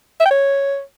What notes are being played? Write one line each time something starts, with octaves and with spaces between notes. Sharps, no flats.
E5
G5
C#5